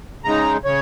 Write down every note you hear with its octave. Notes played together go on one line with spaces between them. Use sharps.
C#3 G#3 D#4 A#5
C#3 C#5